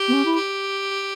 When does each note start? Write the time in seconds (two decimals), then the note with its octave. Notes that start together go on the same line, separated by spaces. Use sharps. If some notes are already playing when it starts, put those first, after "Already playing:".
Already playing: G4
0.08 B3
0.13 C#4
0.25 E4
0.36 G4